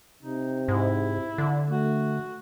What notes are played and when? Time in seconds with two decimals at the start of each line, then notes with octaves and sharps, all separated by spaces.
0.23 C3 D#4
0.68 G#2 E4
1.38 D3
1.70 A3 F#4